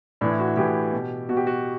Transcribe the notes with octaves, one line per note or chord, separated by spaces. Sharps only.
A2 E3 D4
E4
F#4
E4
A2 E3 G4
B2
B2 F#4
G4
F#4